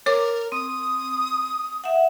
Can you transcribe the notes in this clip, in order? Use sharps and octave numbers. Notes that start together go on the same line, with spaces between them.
A#4 C#5 D6
C4 D#6
E5 F#5